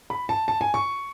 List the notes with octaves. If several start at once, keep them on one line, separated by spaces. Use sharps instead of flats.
B5
A5
A5
G#5
C#6